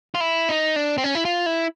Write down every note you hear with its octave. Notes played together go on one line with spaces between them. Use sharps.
F4
E4
D#4
D4
C4
C#4
E4
F4
E4